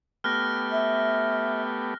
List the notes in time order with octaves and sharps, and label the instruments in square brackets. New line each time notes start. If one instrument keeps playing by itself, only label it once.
[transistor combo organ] A3 B3 G4 [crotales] F6 F#6 A#6
[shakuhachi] E5